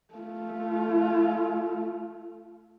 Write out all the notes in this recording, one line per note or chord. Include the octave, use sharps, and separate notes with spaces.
A3 F4